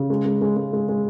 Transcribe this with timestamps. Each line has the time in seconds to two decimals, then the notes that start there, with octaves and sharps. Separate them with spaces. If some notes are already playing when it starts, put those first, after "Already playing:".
Already playing: C#3
0.10 G#3
0.25 G#3
0.41 G#3
0.57 G#3
0.73 G#3
0.89 G#3